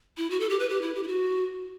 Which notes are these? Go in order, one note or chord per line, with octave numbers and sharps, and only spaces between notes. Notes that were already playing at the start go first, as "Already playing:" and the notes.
E4
F#4
A4
G4
B4
G4
E4
G4
E4
F#4